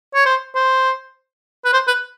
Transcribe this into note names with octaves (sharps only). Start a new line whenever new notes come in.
C#5
C5
C5
B4
C5
B4